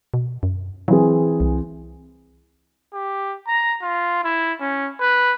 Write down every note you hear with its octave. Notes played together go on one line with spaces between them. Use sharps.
B2
F#2
E3 F#3 C4 G#4
C2
G4
A#5
F4
E4
C#4
B4